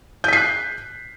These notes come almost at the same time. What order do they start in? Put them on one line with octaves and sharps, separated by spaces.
G6 B6 C7 F#6